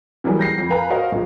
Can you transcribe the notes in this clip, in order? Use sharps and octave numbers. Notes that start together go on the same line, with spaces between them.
E3 F#3 G3 A#3 G#4
G6 A#6 C7
F2
A#4 B4 F5 G#5 A#5 B5
F#4 A#4 C5 D#5 F5
A#1 G#3